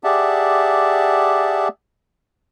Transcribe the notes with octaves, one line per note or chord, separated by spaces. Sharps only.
G4 G#4 D5 E5 F#5 A5